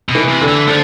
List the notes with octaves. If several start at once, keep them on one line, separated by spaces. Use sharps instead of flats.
B2
E3
C3
D3
E3
D3 F3